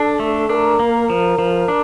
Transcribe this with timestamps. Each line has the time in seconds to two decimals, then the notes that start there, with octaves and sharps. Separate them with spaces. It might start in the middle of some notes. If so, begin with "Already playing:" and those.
Already playing: D4 A4
0.20 A3
0.49 D4 A#4
0.80 A#3
1.10 F3
1.39 F3
1.68 D4